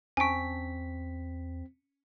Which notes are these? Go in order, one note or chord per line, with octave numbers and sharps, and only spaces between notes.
E2 C4 C#4 G#5 A5 C#6 B6 D7